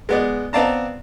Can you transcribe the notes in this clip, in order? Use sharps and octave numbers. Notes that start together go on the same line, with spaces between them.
G#3 B3 D5
B3 C4 D5 F5 A5 A#5